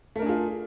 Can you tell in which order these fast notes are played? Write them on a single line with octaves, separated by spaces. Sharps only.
A3 A#4 D4 G#4 F4